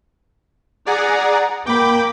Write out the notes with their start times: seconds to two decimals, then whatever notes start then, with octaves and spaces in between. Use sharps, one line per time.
0.86 G#4 D5 F#5 A#5
1.66 A#3 G5 B5 D6